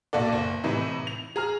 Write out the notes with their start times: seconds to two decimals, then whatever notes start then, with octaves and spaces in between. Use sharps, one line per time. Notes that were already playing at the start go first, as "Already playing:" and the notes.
0.13 B1 A#2 F#4 A4 D5
0.32 F#1
0.64 A2 C3 E3 D#4
1.07 F7
1.36 G#4 A#5 F6